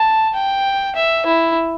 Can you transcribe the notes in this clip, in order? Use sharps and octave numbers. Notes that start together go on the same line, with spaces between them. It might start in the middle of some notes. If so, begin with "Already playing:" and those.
Already playing: A5
G5
E5
E4